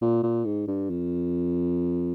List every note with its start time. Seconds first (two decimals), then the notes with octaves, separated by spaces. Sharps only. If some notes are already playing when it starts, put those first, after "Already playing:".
0.02 A#2
0.23 A#2
0.45 G#2
0.67 G2
0.90 F2